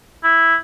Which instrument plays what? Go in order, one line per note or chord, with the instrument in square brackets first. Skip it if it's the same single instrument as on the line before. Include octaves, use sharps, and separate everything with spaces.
[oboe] E4